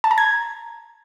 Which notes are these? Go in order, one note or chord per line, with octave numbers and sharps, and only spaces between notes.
A5
A#5
G#6